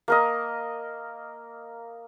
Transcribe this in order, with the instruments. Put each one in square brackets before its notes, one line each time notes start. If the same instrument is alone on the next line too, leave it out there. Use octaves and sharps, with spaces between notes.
[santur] A#3 A#4 D#5